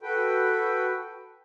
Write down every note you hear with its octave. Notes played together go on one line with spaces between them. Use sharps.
F#4 A4 B4 G5